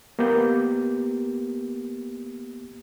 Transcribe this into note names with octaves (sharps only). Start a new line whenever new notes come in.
A#3 B3 G4 G6